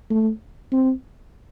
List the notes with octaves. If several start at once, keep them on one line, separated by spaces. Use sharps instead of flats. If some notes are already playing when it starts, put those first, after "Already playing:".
A3
C4